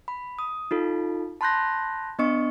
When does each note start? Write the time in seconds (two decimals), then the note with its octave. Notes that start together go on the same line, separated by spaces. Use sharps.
0.08 B5
0.39 D#6
0.71 D#4 F4 A4
1.41 A5 B5 C6 F#6 G6 A#6
2.19 B3 D4 D#5 C#6 C#7